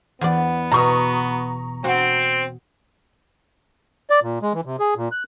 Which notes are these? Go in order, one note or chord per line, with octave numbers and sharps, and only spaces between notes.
E2 B3 D5
B2 A#5 C#6 D#6
C4 F#4
D5
A#2
G#3
E3
C3
G#4
A#2
F#6